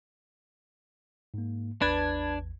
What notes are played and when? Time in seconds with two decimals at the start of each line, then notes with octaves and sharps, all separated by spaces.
1.34 G#2 A#3
1.82 A1 E2 D4 B4 A5 G#6